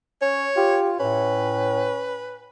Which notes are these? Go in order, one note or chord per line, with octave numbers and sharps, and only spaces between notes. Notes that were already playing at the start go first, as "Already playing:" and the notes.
C#4 C#5
F4 G4
A2 C#4 B4